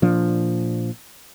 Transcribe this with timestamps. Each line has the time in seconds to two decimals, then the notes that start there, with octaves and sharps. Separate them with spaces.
0.02 A#2 F3 D4